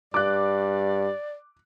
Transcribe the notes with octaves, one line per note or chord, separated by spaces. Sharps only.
G2 D5 D6 F#6